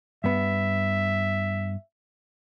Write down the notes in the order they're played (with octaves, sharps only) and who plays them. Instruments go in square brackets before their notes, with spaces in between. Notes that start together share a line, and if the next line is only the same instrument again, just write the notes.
[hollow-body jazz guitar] G2 B3 [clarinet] E5